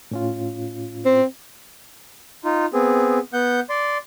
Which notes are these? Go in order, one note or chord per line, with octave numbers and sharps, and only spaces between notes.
A2 C#4 F4
C4
D#4 F4
B3 C4 G#4
B3 F#5 G6
D5 C6